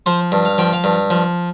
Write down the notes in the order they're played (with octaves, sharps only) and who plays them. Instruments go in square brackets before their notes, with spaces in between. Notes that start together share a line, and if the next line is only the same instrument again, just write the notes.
[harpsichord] F3 C5
G2
F5
F3 G5
F5
G2
F3